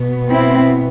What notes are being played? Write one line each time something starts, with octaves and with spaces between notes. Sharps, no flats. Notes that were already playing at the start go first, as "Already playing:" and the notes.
Already playing: B2 B3
C4 E4